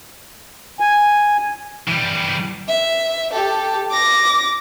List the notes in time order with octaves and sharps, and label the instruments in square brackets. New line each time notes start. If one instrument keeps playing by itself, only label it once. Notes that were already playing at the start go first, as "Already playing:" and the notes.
[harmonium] G#5
[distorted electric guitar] E3 G3
[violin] E5
G4 A4
D6 A#6